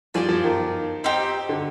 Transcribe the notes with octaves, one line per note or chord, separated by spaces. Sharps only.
F3 G4 D5 G#5
F3
D#3
C4 D#4 G4
D3